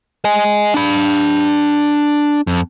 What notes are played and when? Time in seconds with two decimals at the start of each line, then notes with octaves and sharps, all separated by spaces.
0.25 D#5 G#5
0.74 D4 B5
2.47 F2